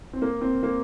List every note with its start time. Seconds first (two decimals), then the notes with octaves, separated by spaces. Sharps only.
0.13 C4
0.22 A#3
0.41 C4
0.63 A#3